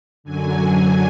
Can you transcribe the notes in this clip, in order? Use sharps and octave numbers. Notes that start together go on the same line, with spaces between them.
F#2 D3 F#3 G#5